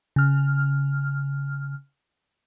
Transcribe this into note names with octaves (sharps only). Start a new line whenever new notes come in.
C#3 F6